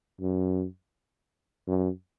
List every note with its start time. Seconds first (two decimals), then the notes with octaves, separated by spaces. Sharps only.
0.21 F#2
1.67 F#2